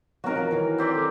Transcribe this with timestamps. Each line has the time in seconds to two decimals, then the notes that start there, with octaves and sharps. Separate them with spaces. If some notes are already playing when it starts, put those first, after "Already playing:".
0.24 F#3 C4 D#4 F#4 A#4
0.35 F3 F#3
0.51 D#3 E3 F#3
0.78 C4 G4 D5
0.95 A4